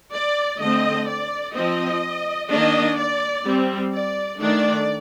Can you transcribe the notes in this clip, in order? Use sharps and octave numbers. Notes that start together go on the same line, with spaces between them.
D5
D3 A3 C4 D#5
D5
F3 C4 D#5
D#3 A#3 D4 D#5
D5
G3 C4
D5
D#3 A3 D4 D5